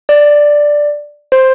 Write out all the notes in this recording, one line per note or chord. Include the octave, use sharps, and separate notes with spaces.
D5
C5